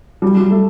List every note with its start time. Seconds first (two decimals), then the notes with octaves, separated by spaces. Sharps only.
0.22 G3
0.37 G3
0.51 A3